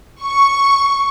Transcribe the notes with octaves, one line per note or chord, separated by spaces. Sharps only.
C#6